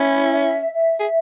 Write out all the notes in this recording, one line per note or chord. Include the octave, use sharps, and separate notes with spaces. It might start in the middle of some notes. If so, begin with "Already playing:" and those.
Already playing: C#4 E4
E5
E5
G#4